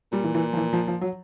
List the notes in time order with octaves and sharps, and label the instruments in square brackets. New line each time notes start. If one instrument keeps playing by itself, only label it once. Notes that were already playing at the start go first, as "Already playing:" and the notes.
[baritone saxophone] A#2 [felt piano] G3
[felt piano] E3
E3
F3
E3
F3
F3
F#3